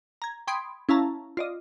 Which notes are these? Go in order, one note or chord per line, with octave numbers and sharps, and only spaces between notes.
A#5 G#6
G5 B5 C6 D#6 G#6 D7
C#4 E4 F5 A5 A#5
F4 D5 D#5